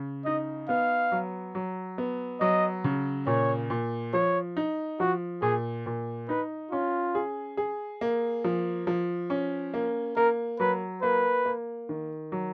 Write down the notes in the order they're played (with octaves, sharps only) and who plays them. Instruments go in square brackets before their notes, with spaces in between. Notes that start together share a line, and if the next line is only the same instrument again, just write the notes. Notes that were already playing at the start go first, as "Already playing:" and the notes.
Already playing: [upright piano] C#3
[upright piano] D#4 [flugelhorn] D#5
[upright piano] B3 [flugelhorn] F5
[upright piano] F#3
F#3
B3
[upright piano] F#3 [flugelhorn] D#5
[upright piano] C#3
[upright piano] A#2 [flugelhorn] C#5
[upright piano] A#2
[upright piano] F3 [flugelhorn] C#5
[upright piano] D#4
[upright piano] F3 [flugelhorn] F#4
[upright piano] A#2 [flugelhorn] G#4
[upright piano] A#2
[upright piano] D#4 [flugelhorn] B4
[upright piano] C#4 [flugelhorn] F4
[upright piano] G#4
G#4
A#3
F3
F3
C#4
A#3
[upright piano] A#3 [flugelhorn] A#4
[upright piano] F#3 [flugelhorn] B4
[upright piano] A#3 [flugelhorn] B4
[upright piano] A#3
D#3
F#3